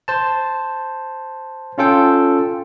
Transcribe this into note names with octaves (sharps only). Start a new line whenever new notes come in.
C5 A5
C#4 F4 A4 G5